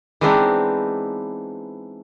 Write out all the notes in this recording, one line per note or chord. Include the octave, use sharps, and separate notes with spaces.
E3 G#3 B3 C4 D4 D#4